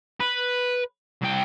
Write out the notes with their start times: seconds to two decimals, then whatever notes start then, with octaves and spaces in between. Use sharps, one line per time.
0.20 B4
1.22 C2 G5